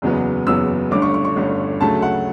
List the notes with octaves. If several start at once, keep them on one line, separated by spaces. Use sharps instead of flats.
F#1 E2 C#3 F#3 B3
F#1 E2 C#3 F#3 B3 E6
G1 G2 D3 A3 C#4 D6
C#6
C#6
C#6
G1 G2 D3 A3 C#4
D2 C#3 F#3 A3 A5
F#5